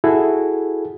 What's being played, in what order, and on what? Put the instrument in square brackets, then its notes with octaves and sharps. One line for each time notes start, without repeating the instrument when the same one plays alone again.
[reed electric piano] E4 F#4 G#4 A4